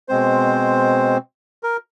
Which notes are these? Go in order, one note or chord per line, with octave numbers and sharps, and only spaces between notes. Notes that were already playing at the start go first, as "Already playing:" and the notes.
B2 G#3 C4 C5
A#4